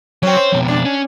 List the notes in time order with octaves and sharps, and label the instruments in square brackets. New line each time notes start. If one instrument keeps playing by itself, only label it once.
[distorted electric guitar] F#3 [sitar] C4 C#4
[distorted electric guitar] C5
F2 B2
[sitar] D4
[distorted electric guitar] C#4